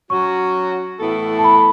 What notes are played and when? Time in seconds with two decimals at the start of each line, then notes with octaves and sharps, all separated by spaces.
0.10 F#3 C#4 F#4 C#6
1.00 A2 E3 B3 E4 A4
1.39 A5
1.44 B5